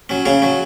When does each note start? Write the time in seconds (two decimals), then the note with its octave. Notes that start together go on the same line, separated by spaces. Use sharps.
0.09 F#3 C#4
0.26 C#3 C#4 C#5
0.42 F#3 C#4